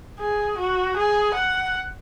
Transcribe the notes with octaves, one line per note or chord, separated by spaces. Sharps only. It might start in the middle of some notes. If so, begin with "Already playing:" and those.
G#4
F#4
G#4
F#5